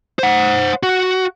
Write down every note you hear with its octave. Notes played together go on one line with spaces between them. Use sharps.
C5 F#5
F#4